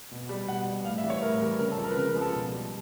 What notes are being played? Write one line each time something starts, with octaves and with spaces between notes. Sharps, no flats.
B2
G3
B2 F#5
G3
A2 F5
E5
E3 G3
C#5
A2 A#4
E3 G3 A#4
C#3 A#4
A4
F3 G#3
A#4
B4
C#3 A#4
B4
F3 G#3
A4
B2
G3